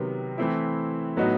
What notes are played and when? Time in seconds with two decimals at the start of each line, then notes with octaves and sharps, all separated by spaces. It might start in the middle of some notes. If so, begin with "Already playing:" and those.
Already playing: C3 D#3 F#3 B3
0.38 E3 A3 C4 E4
1.17 A2 F#3 B3 D#4 F#4